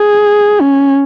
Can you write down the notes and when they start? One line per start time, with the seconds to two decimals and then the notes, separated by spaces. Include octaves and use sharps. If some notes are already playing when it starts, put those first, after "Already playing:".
Already playing: G#4
0.61 C#4